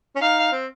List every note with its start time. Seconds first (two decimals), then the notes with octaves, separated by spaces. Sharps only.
0.16 C#4
0.21 D#4 F5
0.52 C4